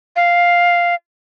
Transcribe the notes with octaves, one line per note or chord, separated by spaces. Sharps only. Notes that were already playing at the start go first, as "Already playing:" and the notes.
F5